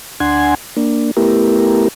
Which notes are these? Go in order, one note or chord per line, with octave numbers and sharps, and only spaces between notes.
D2 D4 F#5 G#5 C6 G#6
A#3 D4
A3 B3 E4 G4 A#4